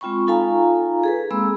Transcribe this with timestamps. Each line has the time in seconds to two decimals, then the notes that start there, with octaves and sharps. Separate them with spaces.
0.01 G#3 C4 F4 G5 B5 C#6
0.27 D#4 F4 A4 F5 G#5 A#5
1.03 G#4 A4 B4
1.31 G#3 A#3 C4 G#4 B5 E6